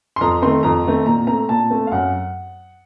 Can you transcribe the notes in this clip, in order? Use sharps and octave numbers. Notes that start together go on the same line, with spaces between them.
C6
F2 A#5
D#3 A3 C4 C6
F2 A#5
D#3 A3 C4
A#2 A#5
A3 C4 A#5
A#2 A5
A3 C4
F5
F#2 F#5